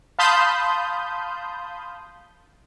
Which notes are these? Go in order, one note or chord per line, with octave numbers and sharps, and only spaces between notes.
F5 A5 B5 C6 D#6 G6